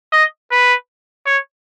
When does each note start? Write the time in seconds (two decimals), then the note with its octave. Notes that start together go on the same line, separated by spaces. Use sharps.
0.13 D#5
0.51 B4
1.26 C#5